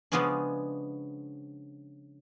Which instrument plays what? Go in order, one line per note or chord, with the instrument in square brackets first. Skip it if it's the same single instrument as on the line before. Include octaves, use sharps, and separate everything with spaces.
[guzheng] C#3 F3 G#3 B3 C#4 D4